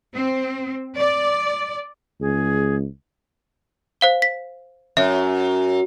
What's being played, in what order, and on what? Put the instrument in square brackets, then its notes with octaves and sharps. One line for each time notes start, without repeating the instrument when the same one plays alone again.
[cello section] C4
D5
[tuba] C#2 [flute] G#4
[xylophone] C5 F5 G7
B6
[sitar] F#2 [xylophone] E5